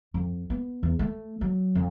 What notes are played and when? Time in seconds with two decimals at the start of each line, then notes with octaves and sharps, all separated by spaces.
0.14 F2
0.50 B3
0.83 E2
0.99 A3
1.41 F#3
1.75 F2